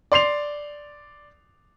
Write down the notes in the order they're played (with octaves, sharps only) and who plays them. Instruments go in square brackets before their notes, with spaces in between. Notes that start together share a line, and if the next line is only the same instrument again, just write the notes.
[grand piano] D5 C6 C7 F7